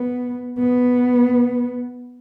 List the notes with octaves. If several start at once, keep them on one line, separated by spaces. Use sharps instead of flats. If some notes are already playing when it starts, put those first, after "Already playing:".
Already playing: B3
B3